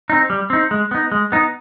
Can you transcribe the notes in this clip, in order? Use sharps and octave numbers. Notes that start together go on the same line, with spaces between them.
C4 D#4
G3
C4 D#4
G#3
B3 D#4
G#3
B3 D#4